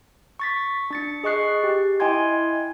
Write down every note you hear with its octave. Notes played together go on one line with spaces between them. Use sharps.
C#6 A6 B6
D4 A6 C#7
G#4 D#5 C#6 F#6 C7
G4
E4 D#5 G5 G#5 C6 G#6